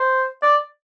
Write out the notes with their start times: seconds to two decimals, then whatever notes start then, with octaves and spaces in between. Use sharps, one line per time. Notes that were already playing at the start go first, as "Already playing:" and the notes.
Already playing: C5
0.43 D5